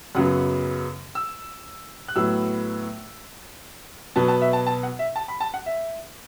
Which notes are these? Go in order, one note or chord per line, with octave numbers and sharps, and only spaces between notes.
F#2 C#3 F#3 B3 F#5
E6
F#6
A2 F#3 B3 E6
B2 F#3 B3 A5
A5
E5
A5
A5
F#5
E5
A5
B5
A5
F#5
E5